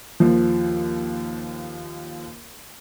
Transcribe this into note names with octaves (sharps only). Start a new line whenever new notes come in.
D#2 F3